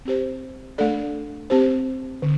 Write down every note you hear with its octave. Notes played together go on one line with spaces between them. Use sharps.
C4 G4 C5
A3 D4 A4 D5
C4 G4 C5
D3